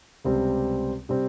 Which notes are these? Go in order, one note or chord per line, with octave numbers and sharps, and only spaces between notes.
C#2 C3 G3 C4
C3 G3 C4